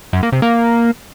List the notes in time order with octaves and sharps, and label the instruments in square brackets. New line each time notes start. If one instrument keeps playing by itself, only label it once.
[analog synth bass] F#2
A#3
C3
A#3